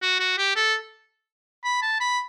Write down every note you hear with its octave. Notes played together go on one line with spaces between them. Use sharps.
F#4
F#4
G4
A4
B5
A5
B5